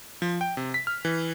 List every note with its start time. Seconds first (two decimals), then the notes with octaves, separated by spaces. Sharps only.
0.22 F3
0.41 G5
0.57 C3
0.74 B6
0.87 F6
1.05 E3